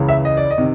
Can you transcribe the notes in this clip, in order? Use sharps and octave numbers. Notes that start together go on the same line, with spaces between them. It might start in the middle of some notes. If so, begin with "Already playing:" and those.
Already playing: C#2 C#3 E3
E5
D#5
D5
D#5
C3 D#3